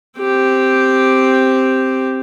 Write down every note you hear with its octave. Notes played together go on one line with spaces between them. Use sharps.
C4 G4